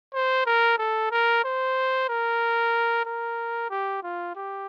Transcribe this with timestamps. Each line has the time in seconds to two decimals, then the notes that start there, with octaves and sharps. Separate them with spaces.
0.14 C5
0.46 A#4
0.78 A4
1.11 A#4
1.44 C5
2.09 A#4
3.05 A#4
3.70 G4
4.03 F4
4.35 G4